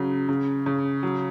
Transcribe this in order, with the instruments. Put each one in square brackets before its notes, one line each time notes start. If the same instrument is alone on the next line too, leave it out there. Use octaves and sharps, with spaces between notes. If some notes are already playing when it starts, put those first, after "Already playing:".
Already playing: [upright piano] C#3 F#3
C#3
C#3
F#3